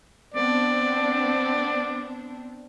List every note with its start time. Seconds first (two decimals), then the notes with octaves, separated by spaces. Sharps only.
0.34 B3 C4 D4 D5